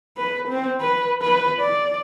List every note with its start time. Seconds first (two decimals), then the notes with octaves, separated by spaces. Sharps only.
0.18 B4
0.48 C4
0.80 B4
1.22 B4
1.60 D5